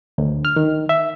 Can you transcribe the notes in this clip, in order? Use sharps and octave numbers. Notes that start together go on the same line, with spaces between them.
D2
F6
D#3
E5